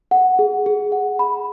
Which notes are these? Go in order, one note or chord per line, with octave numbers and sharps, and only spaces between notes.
F#5
G#4
G#4
F#5
B5